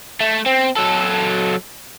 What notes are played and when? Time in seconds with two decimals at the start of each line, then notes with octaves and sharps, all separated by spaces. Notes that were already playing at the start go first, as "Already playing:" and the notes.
0.21 A3
0.46 C4
0.76 F#3 A4